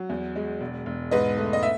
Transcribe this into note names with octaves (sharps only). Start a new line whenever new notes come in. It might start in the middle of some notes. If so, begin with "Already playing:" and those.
Already playing: F#3
E2
G#3
E1
E1
G#2 B4 D#5
A3
D#5
E5